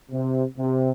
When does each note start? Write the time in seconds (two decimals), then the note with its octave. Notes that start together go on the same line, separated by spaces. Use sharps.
0.11 C3
0.58 C3